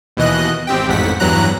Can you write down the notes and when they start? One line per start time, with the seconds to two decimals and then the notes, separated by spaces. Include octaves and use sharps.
0.17 D#2 B2 E3 D#5 F#6
0.67 G#1 C4 G4 G5
0.88 A1 F2 G#2 F#5 B6
1.20 E2 G2 E3 F#3 A#5 F#6